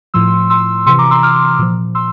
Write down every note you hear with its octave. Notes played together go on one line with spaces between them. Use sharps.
A2 F3 C6 E6
C6 E6
C3 E3 C6 E6
A#5 D6
C6 E6
D6 F6
A#2 F3
C6 E6